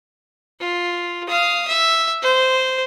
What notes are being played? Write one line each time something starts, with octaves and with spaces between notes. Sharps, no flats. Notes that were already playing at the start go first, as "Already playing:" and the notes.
F4
F5 D#6
E5
C5